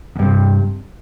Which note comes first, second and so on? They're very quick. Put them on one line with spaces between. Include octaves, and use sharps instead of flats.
E2 G2 C3